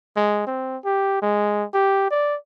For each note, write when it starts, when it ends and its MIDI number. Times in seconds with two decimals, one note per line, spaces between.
0.16 0.44 56
0.47 0.77 60
0.85 1.19 67
1.22 1.64 56
1.74 2.08 67
2.11 2.36 74